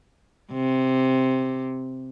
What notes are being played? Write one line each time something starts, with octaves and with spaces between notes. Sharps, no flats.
C3